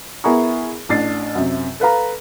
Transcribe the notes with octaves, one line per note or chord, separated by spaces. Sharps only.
B3 E4 G#4 A#4 A#5 C#6
A1 D4 A6 C7
F#2 C3
A4 B4 F5 A#5